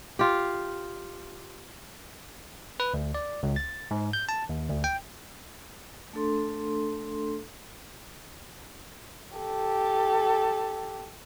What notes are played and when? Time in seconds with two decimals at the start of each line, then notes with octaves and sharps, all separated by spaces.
0.19 F4 G4
2.80 B4
2.94 D2
3.15 D5
3.43 C#2
3.56 A6
3.91 G#2
4.13 G6
4.29 A5
4.49 D#2
4.70 D2
4.84 G5
6.13 A3 D4 A4 C6
9.37 G4 A4